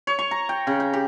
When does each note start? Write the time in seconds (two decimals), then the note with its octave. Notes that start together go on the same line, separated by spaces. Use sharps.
0.07 C#5
0.19 C#6
0.31 A#5
0.49 G5
0.67 C#3
0.80 G5
0.93 G4